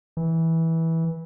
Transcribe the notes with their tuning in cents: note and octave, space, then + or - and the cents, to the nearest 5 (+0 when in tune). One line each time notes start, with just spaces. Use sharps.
E3 -15